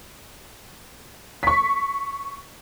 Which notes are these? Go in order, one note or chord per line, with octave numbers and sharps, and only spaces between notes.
C#6 B6